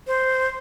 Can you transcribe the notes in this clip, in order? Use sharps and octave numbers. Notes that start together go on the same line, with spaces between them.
C5